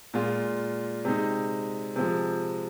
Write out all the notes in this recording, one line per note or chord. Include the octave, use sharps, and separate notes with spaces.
A#2 G#3 F4
C3 G#3 D#4
C3 F3 G#3